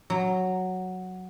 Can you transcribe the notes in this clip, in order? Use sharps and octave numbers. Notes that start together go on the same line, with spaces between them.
F#3